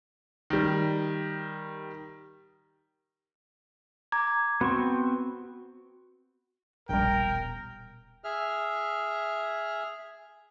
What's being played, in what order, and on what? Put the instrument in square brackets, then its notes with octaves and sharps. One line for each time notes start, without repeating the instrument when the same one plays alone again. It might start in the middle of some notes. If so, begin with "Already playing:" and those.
[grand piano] D#3 G3
[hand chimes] A#5 D6 G#6
[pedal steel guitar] B3 C4 C#6 [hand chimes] F#4
[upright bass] D#1 B2 [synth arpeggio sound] A#1 G3 [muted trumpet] A#4 [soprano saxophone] G5
[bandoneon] G#4 E5 F6